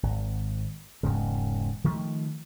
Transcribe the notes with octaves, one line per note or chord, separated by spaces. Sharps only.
G#1
E1 G#2 C#3
D#3 F3 A3